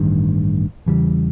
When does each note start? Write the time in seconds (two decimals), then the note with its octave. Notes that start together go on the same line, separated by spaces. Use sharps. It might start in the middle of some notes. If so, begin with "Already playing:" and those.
Already playing: A1 G2 D#3
0.86 E2 C#3 E3 G3